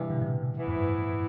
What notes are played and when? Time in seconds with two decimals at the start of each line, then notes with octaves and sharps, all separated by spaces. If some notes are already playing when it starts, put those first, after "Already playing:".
Already playing: G2 C3 E3 G3
0.10 B2 D3
0.21 A2 C3
0.55 E3 B3 E4
0.67 F2 A2
0.78 G2